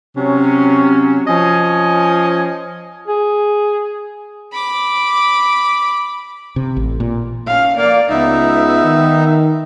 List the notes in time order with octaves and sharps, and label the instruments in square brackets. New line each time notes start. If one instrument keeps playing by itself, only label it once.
[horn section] C3 F#3 C#4
F3 C#4 D#5 G#5
[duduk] G#4
[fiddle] B5 D6
[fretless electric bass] C3
A1
A#2
[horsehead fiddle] C#4 F5
[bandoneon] A#3 [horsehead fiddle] D5 F5
[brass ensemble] C#2 [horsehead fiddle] B3 E5 [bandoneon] D#4
[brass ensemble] D#3